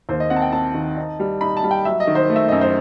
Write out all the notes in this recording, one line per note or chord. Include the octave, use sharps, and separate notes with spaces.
D#2 C5
D#5
C4 F#5
A5
G5
C4 A5
D#3
D#4
G3
D#4 B5
A5
G3
G5
F#3 E5
D#5
D#3
C5
A3
E5
F#2 D#5
C5